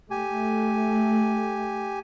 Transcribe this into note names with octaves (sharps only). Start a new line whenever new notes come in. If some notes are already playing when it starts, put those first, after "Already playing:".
A3 G4 G#5